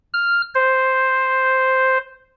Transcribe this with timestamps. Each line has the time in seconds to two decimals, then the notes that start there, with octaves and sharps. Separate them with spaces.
0.13 F6
0.55 C5